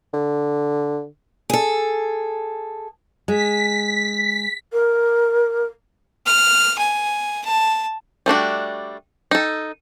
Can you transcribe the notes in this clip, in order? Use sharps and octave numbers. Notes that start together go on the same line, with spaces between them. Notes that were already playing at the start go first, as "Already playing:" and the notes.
D3
G#4 A4
G#3 B6
A#4
F6
G#5
A5
G3 A3 D4 F#4
D#4 A4